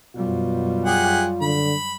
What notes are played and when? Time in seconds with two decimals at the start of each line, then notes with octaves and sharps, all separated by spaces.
0.16 F#2 B2 G3 F4
0.85 G4 G#4 F#5
1.41 D3 B5